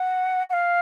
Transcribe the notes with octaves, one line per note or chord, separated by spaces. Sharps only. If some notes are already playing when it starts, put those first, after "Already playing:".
Already playing: F#5
F#5
F5